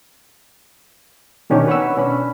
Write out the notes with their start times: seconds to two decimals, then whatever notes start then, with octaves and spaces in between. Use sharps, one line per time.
1.50 B2 D#3 C#4 D4 G4
1.67 B4 C#5 F#5 B5 C#6 E6
1.97 B2 C#4 D4 B5